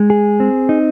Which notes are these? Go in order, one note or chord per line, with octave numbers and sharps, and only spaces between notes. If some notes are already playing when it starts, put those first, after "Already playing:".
Already playing: G#3
G#4
C4
D#4